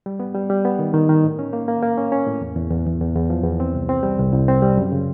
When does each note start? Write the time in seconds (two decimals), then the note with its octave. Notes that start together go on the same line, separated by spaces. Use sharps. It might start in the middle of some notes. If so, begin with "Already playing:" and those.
0.06 G3
0.20 B3
0.35 G3
0.50 G3
0.65 B3
0.79 D#3
0.94 D#3
1.09 D#3
1.24 A2
1.39 C#4
1.53 A#3
1.68 A#3
1.83 A#3
1.98 C#4
2.12 C#4
2.27 A2
2.41 E2
2.56 E2
2.71 E2
2.86 E2
3.01 E2
3.16 E2
3.30 F3
3.44 E2
3.60 C4
3.75 C2
3.89 C4
4.03 G3
4.18 C2
4.32 C2
4.48 C4
4.62 G3
4.77 F#2
4.92 C#3